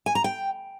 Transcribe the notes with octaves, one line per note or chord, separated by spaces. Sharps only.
G#5
A#5
G5